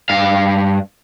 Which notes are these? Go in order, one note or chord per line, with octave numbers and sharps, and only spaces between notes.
G2 F5